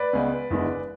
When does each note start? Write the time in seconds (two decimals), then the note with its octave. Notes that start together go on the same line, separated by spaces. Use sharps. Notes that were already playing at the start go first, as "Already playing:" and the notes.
Already playing: B4 D5
0.13 C#2 C#3 G#3 B3
0.50 F#1 E2 D3 G#3